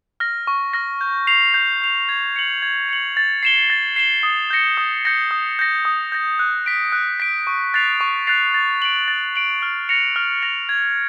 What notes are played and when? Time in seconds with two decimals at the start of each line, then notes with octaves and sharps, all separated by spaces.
0.20 F6 A#6
0.47 C#6
0.73 F6 A#6
1.01 G6
1.27 C7 F7
1.54 G6
1.82 C7 F7
2.09 G#6
2.36 C#7 F#7
2.62 G#6
2.89 C#7 F#7
3.17 A6
3.43 C7 E7 G7
3.70 A6
3.96 C7 E7 G7
4.23 D#6
4.50 G6 A#6 C#7
4.77 D#6
5.05 G6 A#6 C#7
5.31 D#6
5.59 G6 A#6
5.85 D#6
6.12 G6 A#6
6.39 F#6
6.66 B6 D7
6.92 F#6
7.20 B6 D7
7.47 C#6
7.74 F#6 A6 C7 F7
8.01 C#6
8.27 F#6 A6 C7 F7
8.54 A6
8.82 D7 F#7
9.08 A6
9.36 D7 F#7
9.62 F6
9.89 A#6 C#7 F7
10.16 F6
10.42 A#6 C#7 F7
10.69 G#6